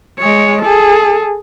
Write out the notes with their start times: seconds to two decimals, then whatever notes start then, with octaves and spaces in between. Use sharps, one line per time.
0.19 G#3 C#5
0.62 G#4 A4